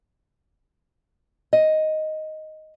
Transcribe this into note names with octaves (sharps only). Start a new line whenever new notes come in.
D#5